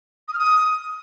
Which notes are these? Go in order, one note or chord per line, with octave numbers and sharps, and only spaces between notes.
D#6
F6
D#6